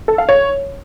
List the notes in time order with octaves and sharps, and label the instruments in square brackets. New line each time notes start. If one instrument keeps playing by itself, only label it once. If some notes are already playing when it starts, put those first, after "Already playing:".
[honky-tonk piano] A4
F5
C#5